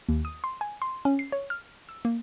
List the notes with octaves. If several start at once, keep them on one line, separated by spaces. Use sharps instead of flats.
D#2
D#6
C6
G#5
C6
C#4
C7
C#5
F6
E6
A#3